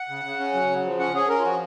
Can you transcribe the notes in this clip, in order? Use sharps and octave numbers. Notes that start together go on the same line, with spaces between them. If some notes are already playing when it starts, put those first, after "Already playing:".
Already playing: F#5
C#3
C#3
C#4
F#3
C#3
F3
C#4 F#5
C#4 G#4
C#4 A#4
F4
F3 F#4